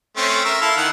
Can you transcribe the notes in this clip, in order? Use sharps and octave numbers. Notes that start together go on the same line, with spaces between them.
A3 C4 C#4
A#4 E5
E4 A4 F5
D#3 F#5